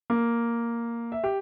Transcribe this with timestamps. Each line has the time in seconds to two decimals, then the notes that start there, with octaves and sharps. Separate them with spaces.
0.10 A#3
1.12 E5
1.24 G4